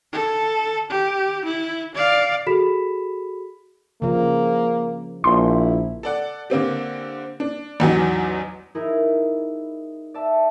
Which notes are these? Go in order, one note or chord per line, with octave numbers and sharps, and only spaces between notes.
A4
G4
E4
D5 F5
F#4 G#4 A4 B5 B6 E7
C#3 F3 A#3
A#1 E4 C6
A4 D5 F#5
D3 A#3 C4 G4
D4
A1 E2 F#3 D#4
D#4 E4 G#4 A#4
D5 E5 A5